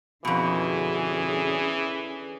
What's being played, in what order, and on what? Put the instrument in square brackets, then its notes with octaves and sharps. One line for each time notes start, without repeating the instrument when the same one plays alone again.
[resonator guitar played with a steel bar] F2 B2 [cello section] D3 C#4 G#4 [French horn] E3